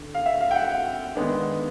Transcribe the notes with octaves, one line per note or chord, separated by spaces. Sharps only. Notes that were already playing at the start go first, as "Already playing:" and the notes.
Already playing: D3
F5
E5
F5
G5
F#5
D#3 G#3 B3 D4